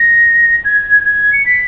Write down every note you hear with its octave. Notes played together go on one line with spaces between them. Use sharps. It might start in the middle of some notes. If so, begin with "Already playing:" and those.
Already playing: A#6
G#6
G#6
C#7
B6